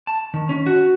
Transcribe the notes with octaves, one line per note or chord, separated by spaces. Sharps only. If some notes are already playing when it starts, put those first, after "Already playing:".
A5
D#3
C#4
F#4